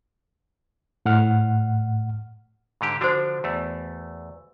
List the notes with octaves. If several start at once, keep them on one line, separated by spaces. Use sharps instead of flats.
A2 F#5 F6
G#2 D3 G4
D3 F3 D4 F#4 C5
E2 A3